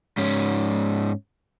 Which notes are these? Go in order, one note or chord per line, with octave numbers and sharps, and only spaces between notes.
G#2 C#4